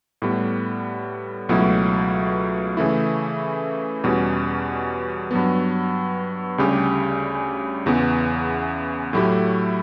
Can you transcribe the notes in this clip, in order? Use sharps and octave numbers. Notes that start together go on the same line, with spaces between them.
A2 G3 B3
C#2 B2 F#3 A3 E4
C#3 E3 A3 E4
E2 B2 G3 C#4
G2 F#3 B3
D2 C#3 G3 C#4 G4
E2 C#3 E3 B3
A2 F#3 A3 E4 G4